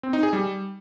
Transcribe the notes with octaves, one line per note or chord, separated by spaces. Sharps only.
C4
D#4
G#4
G3